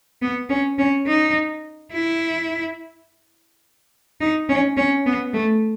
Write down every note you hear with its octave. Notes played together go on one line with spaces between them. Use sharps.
B3
C#4
C#4
D#4
E4
D#4
C#4
C#4
B3
A3